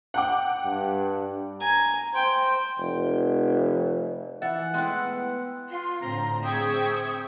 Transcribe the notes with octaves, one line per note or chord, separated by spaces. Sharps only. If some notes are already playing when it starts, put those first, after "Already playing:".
F#5 G5 D6
G2
G#5 A#5
C5 G5
F1
E3 E5 F#5 A6
G#3 A3 B3 E4 G5 C6 F#6
F4 C6
A2 D3 C4 A#5
C4 G#4 E5 G5 C#6 D#6 G#6